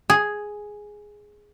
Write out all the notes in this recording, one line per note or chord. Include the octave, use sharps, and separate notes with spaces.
G#4